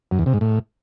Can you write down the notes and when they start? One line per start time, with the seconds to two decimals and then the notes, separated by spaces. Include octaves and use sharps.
0.11 F#2
0.19 E2
0.26 C3
0.34 G#2
0.41 A2